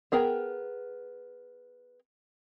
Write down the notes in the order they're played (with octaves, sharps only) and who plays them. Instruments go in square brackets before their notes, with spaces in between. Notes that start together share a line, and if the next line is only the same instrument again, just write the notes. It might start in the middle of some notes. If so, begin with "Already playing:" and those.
[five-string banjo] B3 G#4 A#4 G5